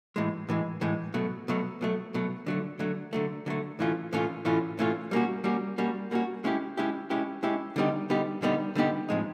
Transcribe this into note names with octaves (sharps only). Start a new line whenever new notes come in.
A2 E3 G#3
A2 E3 G#3
A2 E3 G#3
B2 F#3 A3
B2 F#3 A3
B2 F#3 A3
B2 F#3 A3
D3 F#3 A3
D3 F#3 A3
D3 F#3 A3
D3 F#3 A3
A2 E3 A3 C#4 F4
A2 E3 A3 C#4 F4
A2 E3 A3 C#4 F4
A2 E3 A3 C#4 F4
G3 A#3 C#4 F#4
G3 A#3 C#4 F#4
G3 A#3 C#4 F#4
G3 A#3 C#4 F#4
G#3 C#4 E4 G4
G#3 C#4 E4 G4
G#3 C#4 E4 G4
G#3 C#4 E4 G4
D3 G3 B3 D#4 G4
D3 G3 B3 D#4 G4
D3 G3 B3 D#4 G4
D3 G3 B3 D#4 G4
A2 F3 G#3 C4 D#4